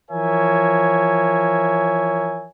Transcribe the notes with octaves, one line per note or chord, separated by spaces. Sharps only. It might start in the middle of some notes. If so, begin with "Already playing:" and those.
E3 F3 A#4 C#5 E5 G#5